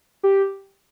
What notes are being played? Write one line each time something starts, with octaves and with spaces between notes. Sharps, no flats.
G4